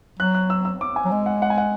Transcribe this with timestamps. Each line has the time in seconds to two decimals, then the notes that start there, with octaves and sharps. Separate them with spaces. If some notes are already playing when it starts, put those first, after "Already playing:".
0.19 F#3 F#6
0.35 F#6
0.50 E6
0.65 E6
0.81 D6
0.96 G#5
1.05 F#3
1.12 G#3
1.26 F#5
1.42 F#5
1.50 G#5
1.58 F#5